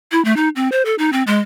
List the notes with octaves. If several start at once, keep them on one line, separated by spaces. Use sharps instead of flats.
E4
A3
D#4
C4
C5
A4
D#4
C4
G#3